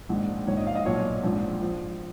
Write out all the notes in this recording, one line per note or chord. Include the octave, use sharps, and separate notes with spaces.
A#1 G#2 D#3
A#1 G#2 D#3 C#5
D#5
F5
D#5
B1 A#2 F3 C#5
A#1 G#2 F3
F3